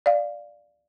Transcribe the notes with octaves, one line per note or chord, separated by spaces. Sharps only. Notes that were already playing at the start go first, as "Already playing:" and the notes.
D5 F5